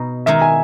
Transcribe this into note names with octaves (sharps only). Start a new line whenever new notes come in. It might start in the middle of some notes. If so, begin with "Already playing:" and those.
Already playing: B2 D#4
D#3 G#3 D#4 E5
G#5